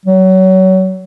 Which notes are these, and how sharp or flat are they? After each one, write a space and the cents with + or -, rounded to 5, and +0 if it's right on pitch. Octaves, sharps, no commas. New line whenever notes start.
F#3 +25